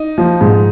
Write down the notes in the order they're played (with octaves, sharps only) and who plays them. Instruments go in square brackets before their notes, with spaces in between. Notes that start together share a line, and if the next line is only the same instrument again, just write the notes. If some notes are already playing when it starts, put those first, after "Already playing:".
Already playing: [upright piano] D#4
[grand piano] F3
G#2